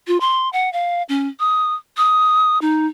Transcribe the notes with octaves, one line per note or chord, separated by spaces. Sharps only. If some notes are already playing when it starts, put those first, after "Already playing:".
F4
C6
F#5
F5
C#4
D#6
D#6
D#4